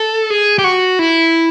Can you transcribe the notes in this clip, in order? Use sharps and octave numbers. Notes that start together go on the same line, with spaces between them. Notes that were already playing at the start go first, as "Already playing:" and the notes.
Already playing: A4
G#4
G4
F#4
E4